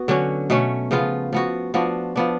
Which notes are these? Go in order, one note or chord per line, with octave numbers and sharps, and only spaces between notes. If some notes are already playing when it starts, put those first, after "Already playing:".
Already playing: B3 F#4
D3 F#3 C#4
B2 A3 C#4
C#3 F3 B3 F4
F3 B3 F#4
F3 B3 D4 F#4
F3 B3 D4